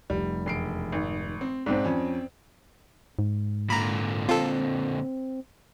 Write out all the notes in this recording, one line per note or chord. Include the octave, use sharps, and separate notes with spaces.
F1 G3
E1 C7 D7
G#1
C4
B1 G#2 C4 D5
F2 C#4
G#2
A#2 D3 A#5 B5
C4 F4 A4